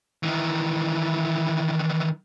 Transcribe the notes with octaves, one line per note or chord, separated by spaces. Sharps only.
D#3 E3